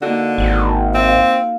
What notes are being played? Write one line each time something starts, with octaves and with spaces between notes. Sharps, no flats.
D3 A#3 D#4 F#4
G#1
C4 F4